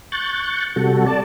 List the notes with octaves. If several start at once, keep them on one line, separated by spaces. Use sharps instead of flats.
C#6 F#6 G6 A6
C3 G3 F#4 A4
D5 A5